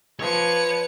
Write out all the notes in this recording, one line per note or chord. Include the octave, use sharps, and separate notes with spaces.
F3 B4 C#5 C#7